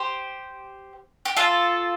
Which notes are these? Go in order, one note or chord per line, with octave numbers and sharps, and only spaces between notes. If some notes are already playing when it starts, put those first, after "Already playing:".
Already playing: G4 C5
G4
F4 A4